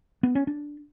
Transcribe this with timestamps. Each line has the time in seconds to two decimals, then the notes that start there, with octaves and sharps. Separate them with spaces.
0.23 B3
0.35 C#4
0.47 D4